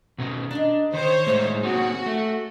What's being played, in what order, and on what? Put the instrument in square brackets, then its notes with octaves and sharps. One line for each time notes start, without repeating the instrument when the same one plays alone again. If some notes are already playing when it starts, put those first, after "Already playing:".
[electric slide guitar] B2 C#4 D#4
[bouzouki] G#3 D#4 A#5 [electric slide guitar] D4
[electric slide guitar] D#3 [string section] C5 C#5
[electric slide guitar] A2 G#3 D#4 [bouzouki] C#3 C#4 E5
[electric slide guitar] A#3 C4 D#4 [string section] F#4
[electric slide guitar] A3